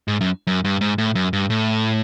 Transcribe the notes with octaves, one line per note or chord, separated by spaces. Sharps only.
G#2
F#2
F#2
G2
G#2
A2
F#2
G2
A2